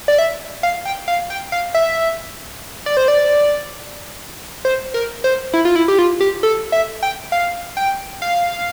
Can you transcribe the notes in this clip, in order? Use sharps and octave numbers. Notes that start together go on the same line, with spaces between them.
D5
E5
F5
G5
F5
G5
F5
E5
D5
C5
D5
C5
A#4
C5
E4
F4
E4
G4
F4
G4
A4
E5
G5
F5
G5
F5